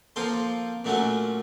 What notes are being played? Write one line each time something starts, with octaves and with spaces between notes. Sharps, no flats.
F3 A#3 F4 A4 C5
A#2 F#3 A3 C#4 F#4